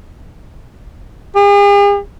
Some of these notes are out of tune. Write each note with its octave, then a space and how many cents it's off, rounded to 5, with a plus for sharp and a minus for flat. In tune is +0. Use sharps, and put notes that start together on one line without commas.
G#4 -45